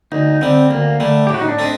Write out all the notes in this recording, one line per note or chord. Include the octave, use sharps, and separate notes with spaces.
D2 D#4
D3 G3 C4
D2 A#3
D3 G3 A3
A2 G4
F#4
D#4
D4
A3 C4 D#4